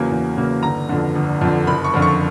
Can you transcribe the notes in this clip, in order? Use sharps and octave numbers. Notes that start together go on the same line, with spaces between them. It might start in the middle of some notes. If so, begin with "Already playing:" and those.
Already playing: E2 C#3 F#3 A#3 G#5
E2
C#3 F#3 A#3
G1 A#5
F2 D3
G1
F2 D3
F#1 B5
C#6
F2 D3 F3
C#6